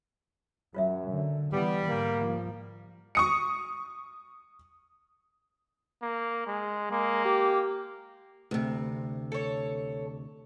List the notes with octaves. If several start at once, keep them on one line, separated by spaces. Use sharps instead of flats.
F#2 F#3 F4 C#5 E5
D3
E3 G3 B3
G#2 D3 A#3
F3 F#5
C#6 D#6 C#7
A#3
G#3
G#3 A#3
G4
D2 C3
A4 C#5